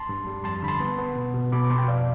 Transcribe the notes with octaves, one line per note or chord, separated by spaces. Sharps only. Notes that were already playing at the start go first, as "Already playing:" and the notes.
Already playing: A5 C6
G2
G3
F2 A5 C6
D3 B5
A5 C6
B3
B3
B2
B2
B2 B5 D6
D6
B2 A5 C6
G5
F2 D5 F5